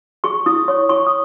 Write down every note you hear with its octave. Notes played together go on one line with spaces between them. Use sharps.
G#4 C#6
E4 D#6
C#5 C#6
E4 C#6
D#6